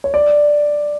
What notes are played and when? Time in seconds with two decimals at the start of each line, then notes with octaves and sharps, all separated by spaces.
0.04 C#5
0.14 D5